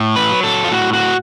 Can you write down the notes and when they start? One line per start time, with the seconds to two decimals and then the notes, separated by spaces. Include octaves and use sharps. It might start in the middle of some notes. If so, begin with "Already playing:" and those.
Already playing: A2
0.16 B4
0.30 F#3
0.44 A4
0.64 F4
0.72 A2 F#4
0.93 F#4